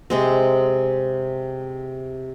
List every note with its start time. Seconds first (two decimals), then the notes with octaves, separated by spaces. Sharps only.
0.10 C3 G#3 C4